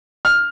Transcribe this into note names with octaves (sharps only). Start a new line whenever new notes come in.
F6